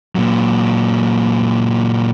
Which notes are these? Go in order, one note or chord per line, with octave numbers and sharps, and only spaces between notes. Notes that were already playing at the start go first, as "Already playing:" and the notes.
A#2 F#3